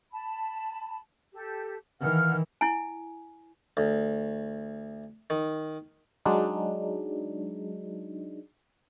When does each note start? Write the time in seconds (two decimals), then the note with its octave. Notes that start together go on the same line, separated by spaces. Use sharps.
0.13 A5 B5
1.33 G4 A4
2.01 D#3 E3 F5 F#5 F6
2.61 E4 G#5
3.77 D2
5.30 D#3
6.26 F#3 G#3 D4 D#4